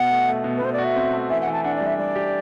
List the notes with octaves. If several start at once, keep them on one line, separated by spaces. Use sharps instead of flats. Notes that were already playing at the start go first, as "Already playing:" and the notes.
Already playing: B2 F#4 F#5
A3
A3
B2
B4
B2 C5
D5
F#4
E5
C4
A3
E3 E5
F#5
E3
A5
D4 F#5
D5
G3
E5
G3 D5
G4